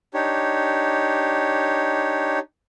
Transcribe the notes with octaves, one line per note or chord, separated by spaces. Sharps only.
D4 D#4 G4 C#5